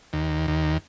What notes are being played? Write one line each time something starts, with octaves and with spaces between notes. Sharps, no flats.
D#2
D#2